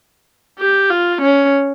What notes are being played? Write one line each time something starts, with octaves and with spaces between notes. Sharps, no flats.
G4
F4
C#4